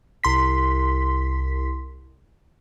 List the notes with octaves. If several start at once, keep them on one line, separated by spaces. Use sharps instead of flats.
C2 C6 B6